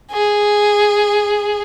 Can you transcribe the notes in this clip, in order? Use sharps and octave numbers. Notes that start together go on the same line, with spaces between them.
G#4